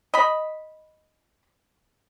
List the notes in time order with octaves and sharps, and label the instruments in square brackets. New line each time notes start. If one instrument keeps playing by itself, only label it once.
[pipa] D#5 B5